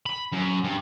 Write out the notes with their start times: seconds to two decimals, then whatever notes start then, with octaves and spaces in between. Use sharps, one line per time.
0.06 B5
0.32 F#2
0.64 G2